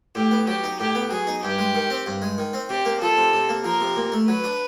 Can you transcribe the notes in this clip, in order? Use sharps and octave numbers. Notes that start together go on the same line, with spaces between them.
A2 G4
B3
F#3 G4
D#4
A2 G4
B3
F#3 G#4
D#4
G2 G4
G#3
D#3
C4
G2
G#3
D#3
C4
C3 G4
A#3
F3 A4
C3
C3
A#3
F3 A#4
C3
A#2
A3
F#3 B4
D4